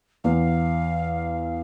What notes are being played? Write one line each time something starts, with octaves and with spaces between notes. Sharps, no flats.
E2 F5